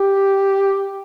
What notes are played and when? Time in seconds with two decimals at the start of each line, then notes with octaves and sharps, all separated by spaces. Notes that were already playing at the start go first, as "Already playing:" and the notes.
Already playing: G4